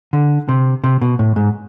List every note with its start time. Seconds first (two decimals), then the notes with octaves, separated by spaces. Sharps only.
0.13 D3
0.49 C3
0.84 C3
1.01 B2
1.19 A2
1.36 G#2